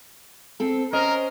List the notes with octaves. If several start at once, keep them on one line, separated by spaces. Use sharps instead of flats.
C4 A4
C#4 A#4 C5 D#5